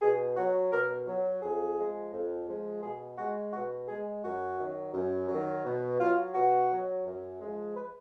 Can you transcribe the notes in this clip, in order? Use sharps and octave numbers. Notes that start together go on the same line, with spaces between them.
B2 G#4
F#3 F#4
B2 A#4
F#3
F2 G#4
F3 G#3
F2
F3 G#3
B2 G#4
G#3 F#4
B2 F#4
G#3 G#4
F#2 F#4
D#3 F#3
F#2
D#3 F#3
B2
F#3 F4
B2 F#4
F#3
F#2
F3 G#3
B4